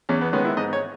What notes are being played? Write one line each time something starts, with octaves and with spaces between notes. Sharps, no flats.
E2 C#4
B3
D#3 G#3 B3 C#4
E4
G#2 D#5
C#5